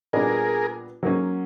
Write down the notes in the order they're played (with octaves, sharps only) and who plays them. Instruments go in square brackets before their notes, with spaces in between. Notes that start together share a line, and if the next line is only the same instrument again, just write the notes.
[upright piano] A#2 G3 B3 D4 [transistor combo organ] G#4 A#4
[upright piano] F#3 A#3 C#4